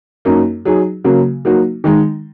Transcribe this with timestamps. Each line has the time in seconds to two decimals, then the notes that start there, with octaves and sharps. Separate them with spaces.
0.25 F#2 F#3 A#3 D#4
0.65 F#3 D#4 G#4
1.04 C#3 F#3 A#3 F#4
1.45 F#3 A#3 D#4 F#4
1.84 D#3 G#3 D#4